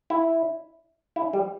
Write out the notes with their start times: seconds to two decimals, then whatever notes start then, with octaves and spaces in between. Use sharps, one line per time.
0.10 E4
1.16 E4
1.33 G3